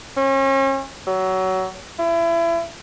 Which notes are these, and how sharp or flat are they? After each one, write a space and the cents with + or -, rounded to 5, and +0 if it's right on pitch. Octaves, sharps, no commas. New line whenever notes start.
C#4 -40
F#3 +20
E4 +30